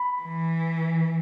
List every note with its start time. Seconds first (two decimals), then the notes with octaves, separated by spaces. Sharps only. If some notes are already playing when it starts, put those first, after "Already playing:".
Already playing: B5
0.23 E3